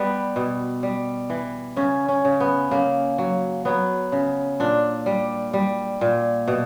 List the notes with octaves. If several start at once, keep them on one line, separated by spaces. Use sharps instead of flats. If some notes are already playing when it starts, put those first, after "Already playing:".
Already playing: G3 B3
B2
G3
E3
C#3 C#4
C#4
C#3
B3
C#3 A#3
F#3
F#3 B3
C#3
A#2 D4
G3
G3
A#2
B2